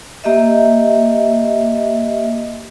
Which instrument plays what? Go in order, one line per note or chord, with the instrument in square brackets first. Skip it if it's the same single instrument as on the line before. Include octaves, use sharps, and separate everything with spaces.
[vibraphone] A#3 G4 D#5 E5